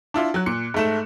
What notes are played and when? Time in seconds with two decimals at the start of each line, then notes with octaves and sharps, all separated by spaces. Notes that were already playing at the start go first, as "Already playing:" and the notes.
0.14 D4 E4 F4
0.34 F#3 F#6
0.46 A#2 C#7
0.74 G#2 A3 E7